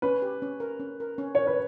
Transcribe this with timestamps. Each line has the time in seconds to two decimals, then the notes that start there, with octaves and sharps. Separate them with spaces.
0.02 C#4 B4
0.22 G4
0.42 C#4
0.60 A#4
0.80 C#4
1.00 A#4
1.18 C#4
1.35 A#4 C#5
1.47 B4